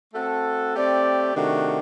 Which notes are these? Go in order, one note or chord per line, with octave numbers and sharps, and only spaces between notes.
A3 C4 F#4 A4
A3 C4 G4 D5
C3 D#3 A3 D4 F#4